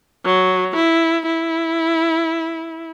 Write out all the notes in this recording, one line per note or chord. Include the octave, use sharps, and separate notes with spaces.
F#3
E4
E4